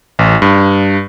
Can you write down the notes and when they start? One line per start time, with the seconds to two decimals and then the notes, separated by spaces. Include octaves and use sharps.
0.19 A1
0.42 G2